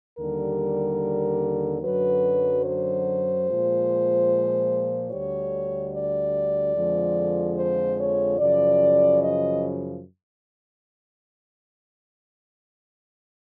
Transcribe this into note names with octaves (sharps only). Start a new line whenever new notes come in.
D#2 D3 G3 A#4
F#2 D3 F#3 B4
C5
A#2 F3 G#3
D2 D3 G3 C#5
D5
F2 D3 F3 G#3
C5
C#5
F#2 C#3 F3 D5
D#5